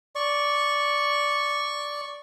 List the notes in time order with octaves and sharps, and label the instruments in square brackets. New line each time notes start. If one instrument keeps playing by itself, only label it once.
[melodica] D5 C#6